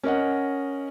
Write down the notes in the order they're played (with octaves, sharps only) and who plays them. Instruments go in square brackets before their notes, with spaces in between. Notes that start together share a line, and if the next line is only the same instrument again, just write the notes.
[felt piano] C#4 A#4 D#5 F#5